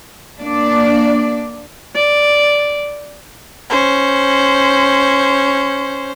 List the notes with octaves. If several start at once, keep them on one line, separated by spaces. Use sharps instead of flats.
A#3 D4 D5
D5
C#4 C5